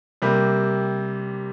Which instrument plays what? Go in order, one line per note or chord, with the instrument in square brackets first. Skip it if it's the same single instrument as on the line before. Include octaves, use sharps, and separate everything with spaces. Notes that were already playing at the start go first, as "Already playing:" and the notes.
[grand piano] C3 G3 A#3